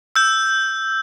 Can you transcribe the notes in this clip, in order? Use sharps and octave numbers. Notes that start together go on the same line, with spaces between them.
E6 G6